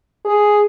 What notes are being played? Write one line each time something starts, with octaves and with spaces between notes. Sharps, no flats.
G#4